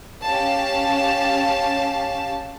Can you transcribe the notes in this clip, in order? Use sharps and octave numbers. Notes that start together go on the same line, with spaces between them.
C#4 G4 F5 A5